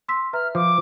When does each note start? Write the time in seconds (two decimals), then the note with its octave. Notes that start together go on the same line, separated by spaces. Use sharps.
0.09 C6 E6 B6
0.33 B4 E5 A#5 F6
0.55 F3 D6